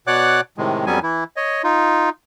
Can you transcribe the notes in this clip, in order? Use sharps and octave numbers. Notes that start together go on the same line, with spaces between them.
B2 C#5 D5 F#5 D6 F#6
A2 C3 D#3 G#3
F2 F#3 G3 B3 C#4 G#5
E3 E4
C#5 D#5
D#4 F4